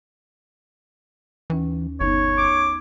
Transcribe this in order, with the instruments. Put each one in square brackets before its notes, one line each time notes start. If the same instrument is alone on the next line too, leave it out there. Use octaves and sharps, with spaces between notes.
[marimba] D#2 C#4 [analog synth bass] E3
[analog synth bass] G1 [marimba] B3 D#4 [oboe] C#5
[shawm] D6